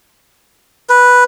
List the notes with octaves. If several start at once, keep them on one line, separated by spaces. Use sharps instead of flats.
B4